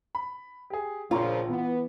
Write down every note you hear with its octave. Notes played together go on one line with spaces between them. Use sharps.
B5
G4 G#4
A#1 A#2 C#3 F3 F4 A#5 C#6
E3 B3